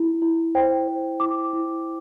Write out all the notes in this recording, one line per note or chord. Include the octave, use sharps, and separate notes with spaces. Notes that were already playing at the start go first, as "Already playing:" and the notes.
Already playing: E4
E4
C5 G5
C5
E4 D6
E4